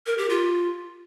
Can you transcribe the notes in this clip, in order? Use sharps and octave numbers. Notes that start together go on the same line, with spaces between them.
A#4
G4
F4